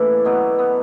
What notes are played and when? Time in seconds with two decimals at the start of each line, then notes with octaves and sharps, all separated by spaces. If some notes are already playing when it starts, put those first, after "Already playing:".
Already playing: A2 C#3 E3 A#3 D4 E4
0.25 B2 F#3 B3
0.59 B3